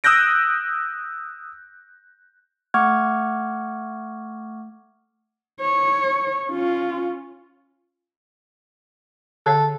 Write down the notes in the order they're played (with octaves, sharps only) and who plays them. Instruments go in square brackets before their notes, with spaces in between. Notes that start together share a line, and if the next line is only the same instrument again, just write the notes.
[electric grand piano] D#6 E6 F#6 G6 A#6 D7
[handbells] A3 F#5 C#6 D6 F6 G#6
[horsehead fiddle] C#5
C#4 F4
[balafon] D3 C#5 F5 [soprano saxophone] A4